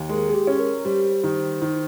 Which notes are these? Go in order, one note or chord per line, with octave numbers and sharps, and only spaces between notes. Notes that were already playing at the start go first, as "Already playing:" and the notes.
Already playing: D#2
G#3 A#4
G#4
G4
C#4
A#4
G3 C5
D#3
D#3